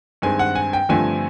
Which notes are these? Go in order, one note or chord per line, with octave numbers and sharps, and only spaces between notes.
G2 D#3 G#3 C4 G#5
F#5
G#5
G5
G2 D3 F3 A3 C4 G#5